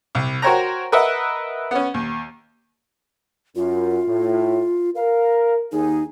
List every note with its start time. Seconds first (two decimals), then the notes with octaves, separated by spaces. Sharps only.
0.15 C2
0.42 F#4 A#4 C5 C#5 G5 A#5
0.92 A#4 B4 D#5 E5 F#5
1.71 B3 C#4
1.94 D#2
3.56 F#2 F4
4.07 A2
4.95 A#4 F5
5.72 D#2 D#4 G#4